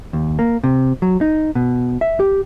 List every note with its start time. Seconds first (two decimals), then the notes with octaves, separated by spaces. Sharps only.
0.13 D#2
0.39 A#3
0.64 C3
1.02 F#3
1.21 D#4
1.55 B2
2.01 E5
2.20 G4